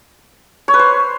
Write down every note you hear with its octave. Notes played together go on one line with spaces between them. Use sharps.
C#5
B4
C5